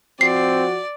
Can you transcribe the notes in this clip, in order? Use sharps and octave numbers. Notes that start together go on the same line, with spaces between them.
F3 C4 F#4 D5 C7